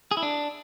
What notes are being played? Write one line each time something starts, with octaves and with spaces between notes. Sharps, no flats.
G#4
E4
D4